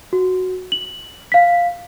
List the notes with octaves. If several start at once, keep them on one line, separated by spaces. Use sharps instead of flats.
F#4
F#7
F5 B6